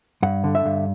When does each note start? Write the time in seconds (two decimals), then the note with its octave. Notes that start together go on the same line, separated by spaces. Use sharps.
0.23 G2 F#5
0.44 D3
0.55 E5
0.66 G2